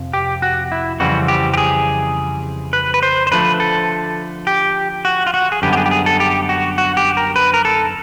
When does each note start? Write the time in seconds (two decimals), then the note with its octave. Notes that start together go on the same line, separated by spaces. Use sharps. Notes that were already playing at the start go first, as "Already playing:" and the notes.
Already playing: F2 C3 F3
0.13 G4
0.42 F#4
0.72 E4
1.00 F2 C#3 E3 G3 C4 F#4
1.28 G4
1.54 G4
1.58 G#4
2.73 B4
2.94 B4
3.03 C5
3.27 C5
3.32 D3 F3 A3 B4
3.60 A4
4.47 G4
5.05 F#4
5.27 F4
5.34 F#4
5.52 G#4
5.62 F#2 D3 G3 B3 G4
5.73 G4
5.77 G#4
5.86 G4
5.91 G#4
6.06 A4
6.20 G4
6.49 F#4
6.78 F#4
6.97 G4
7.17 A#4
7.36 B4
7.54 A#4
7.65 A4